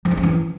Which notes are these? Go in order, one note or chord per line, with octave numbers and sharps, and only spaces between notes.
F3
D#4
C#4
E3